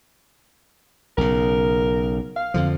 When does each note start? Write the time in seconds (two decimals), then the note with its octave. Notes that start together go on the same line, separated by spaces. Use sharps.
1.18 B1 C#3 A#4
2.36 F5
2.54 F2 D3 F3